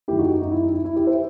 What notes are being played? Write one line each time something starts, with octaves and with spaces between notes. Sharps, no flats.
F#2 D#3 A3 E4 G4
D#4 F#4
D#4
D#4
E4
D#4
E4
E4
E4 G4
C5 E5